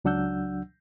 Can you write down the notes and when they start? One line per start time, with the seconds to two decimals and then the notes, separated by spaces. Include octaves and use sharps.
0.05 C#2 F#3 D4 F#5 E6 G6